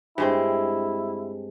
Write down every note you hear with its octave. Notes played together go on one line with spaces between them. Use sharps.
G2 G#3 C4 E4